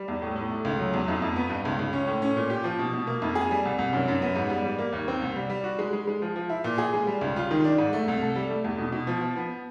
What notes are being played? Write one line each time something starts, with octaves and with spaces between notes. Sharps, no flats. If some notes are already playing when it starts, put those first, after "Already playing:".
Already playing: G3
E2
A2
A2
A3
C#2
F#3
E2
F2
F2
B3
G2
C#2
C#2
C#4
A2
C#4
A#2
G4
F3
B2
B2
A#3
F2
G#4
G3
C2
C2
F#2
F#2
B3
G#2
G3
G3
A#3
D#2
C4
C2
G3
G3
F#4
G#3
G#3
G#3
F3
F3
E4
A#2
G#4
G#3
G3
C#2
F4
D#3
D4
G#2
A3
C2
A4
G3
A3
E2
B2
B2
F3
F3
B3